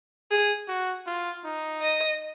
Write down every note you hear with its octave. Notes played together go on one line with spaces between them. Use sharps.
G#4
F#4
F4
D#4
D#5